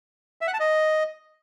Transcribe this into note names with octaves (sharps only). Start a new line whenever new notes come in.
E5
F#5
A5
D#5